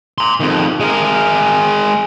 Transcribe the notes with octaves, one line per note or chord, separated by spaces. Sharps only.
A#5 C6
F2 D#3
G#3 A#4